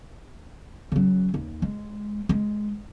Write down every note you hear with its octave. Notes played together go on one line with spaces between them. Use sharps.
C#3 F#3
D#2
G#3
G#3